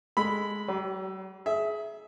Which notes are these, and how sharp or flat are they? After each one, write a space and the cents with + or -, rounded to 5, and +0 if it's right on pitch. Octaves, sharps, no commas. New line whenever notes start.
G#3 +0 A4 +0 B5 +0
F#3 +45 G4 -25
G#4 +25 E5 +0